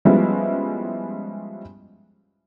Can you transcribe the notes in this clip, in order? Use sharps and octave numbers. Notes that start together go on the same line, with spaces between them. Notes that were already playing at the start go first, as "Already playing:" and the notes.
F3 G3 G#3 B3 C#4 E4